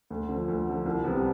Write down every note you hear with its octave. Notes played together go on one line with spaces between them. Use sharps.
D2
D3 F3
D2
D3 F3
C2
C3 G3 B3